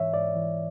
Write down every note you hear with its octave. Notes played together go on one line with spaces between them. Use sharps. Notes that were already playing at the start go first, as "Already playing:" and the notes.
Already playing: G#2 E3 C#5 E5
G#2 D5
E3